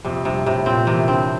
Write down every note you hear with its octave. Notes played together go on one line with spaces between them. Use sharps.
F2 C3
G2 C3
A2 C3
A#2 C4
C3 E3
D3 C4